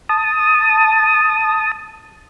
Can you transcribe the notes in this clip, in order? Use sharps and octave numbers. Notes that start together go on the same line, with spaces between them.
A5 D#6